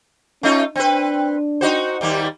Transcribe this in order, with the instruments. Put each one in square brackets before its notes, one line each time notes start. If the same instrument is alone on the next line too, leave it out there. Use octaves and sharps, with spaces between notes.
[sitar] A3 D#4 F4 [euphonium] C#4
[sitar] C4 B4 [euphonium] D4
[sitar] D#4 F#4 C5
D#2 G3 A#3